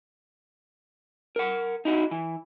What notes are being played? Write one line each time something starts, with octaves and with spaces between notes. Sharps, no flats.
A#4 F#5
D#4 E4 F#4
E3